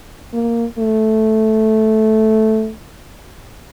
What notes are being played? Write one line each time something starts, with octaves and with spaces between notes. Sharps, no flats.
A#3
A3